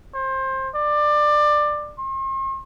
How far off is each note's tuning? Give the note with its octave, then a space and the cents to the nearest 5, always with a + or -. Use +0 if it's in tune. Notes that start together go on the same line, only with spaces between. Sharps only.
C5 +25
D5 +20
C6 +45